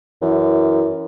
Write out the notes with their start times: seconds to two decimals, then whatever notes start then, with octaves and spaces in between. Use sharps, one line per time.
0.22 F#2 E3